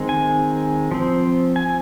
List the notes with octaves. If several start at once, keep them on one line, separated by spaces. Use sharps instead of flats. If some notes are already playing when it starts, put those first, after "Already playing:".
Already playing: D#3 G#3 C4
G#5
F3 C4
G#5